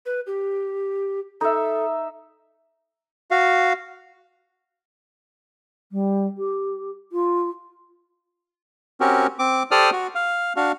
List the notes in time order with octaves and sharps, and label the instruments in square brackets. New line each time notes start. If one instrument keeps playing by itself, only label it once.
[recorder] B4
G4
[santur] D#4 E5 [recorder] A4
[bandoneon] F#4 F5
[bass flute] G3
G4
F4
[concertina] C4 C#4 F#4 G4 A#4
C4 D6
G4 A4 C5 D5 D#6 F6
F#4
F5
D4 F#4 F5